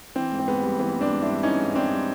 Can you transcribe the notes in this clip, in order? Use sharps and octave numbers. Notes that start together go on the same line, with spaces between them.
E3 C4
G#2
C4
G#2 B3
G3
E3 B3
G#2
C4 D4
G#2
D4 E4
G3
E3 C#4 D#4
G#2
G#2 C4 D4
G3